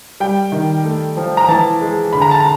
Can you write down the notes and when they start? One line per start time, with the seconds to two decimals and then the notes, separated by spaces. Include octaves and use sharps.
0.20 G3 G5
0.52 D#3
0.84 A3
1.17 F3
1.37 A#5
1.49 E3 A5
1.81 G#3
2.13 D3 B5
2.22 A#5
2.31 A5
2.40 A#5